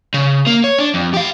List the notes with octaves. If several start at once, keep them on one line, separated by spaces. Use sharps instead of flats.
C#3
A#3
C#5
D4
F2
G4 F5